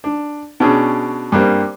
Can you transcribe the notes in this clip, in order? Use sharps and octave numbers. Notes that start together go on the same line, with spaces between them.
D4
B2 C#4 D4 G#4
G2 G3 A#3 C4